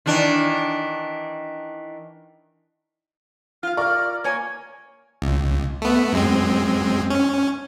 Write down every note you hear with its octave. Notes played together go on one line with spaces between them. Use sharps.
D#3 E3 D4
F4 F5 F6
A#4 D5 C#6 F6
A#3 C#5 G#5 G#6
C#2
A3 B3
F#2 G#3 C4
C#4